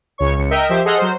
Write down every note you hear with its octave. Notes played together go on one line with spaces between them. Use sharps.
C#2 C#5 C#6
C#2 C#7
A#4 D#5 E5 G5
F3 G4 C5 E5
G#4 A4 D#5 F#5 C6 F6
F#3 C5